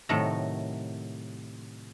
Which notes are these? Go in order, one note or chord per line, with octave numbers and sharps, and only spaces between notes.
A2 C3 D#3 F#3 A3 A#5